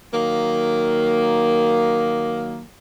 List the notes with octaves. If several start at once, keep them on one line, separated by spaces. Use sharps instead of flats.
D#3 F#3 A#3